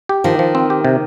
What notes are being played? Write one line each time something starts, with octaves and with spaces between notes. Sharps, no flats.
G4
D#3 F3
F3
C4
G4
C3